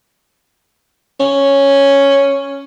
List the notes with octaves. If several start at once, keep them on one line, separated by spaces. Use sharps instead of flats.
C#4